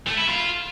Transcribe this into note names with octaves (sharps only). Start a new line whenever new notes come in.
A3
E4
F4